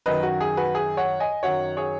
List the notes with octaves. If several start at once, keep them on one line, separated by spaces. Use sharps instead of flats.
F#2 D#3 F#3 B4 D#5
F#4
G#4
F#4 B4
G#4
C#5 F#5
D#5 G#5
F#2 D#3 F#3 C#5 F#5
G#4 C#5